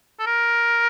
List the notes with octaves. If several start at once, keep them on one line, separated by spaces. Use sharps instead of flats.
A4
A#4